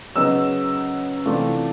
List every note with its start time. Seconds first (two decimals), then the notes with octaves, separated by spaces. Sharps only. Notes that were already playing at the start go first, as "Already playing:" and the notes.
0.16 C#3 F#3 B3 D#4 E6
1.25 C3 E3 A3 D4 F4